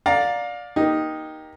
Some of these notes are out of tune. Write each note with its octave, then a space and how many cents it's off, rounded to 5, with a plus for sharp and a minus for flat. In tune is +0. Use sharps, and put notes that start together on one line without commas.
D5 +0 F5 +25 A#5 +0
A#3 +20 D#4 +0 G4 +0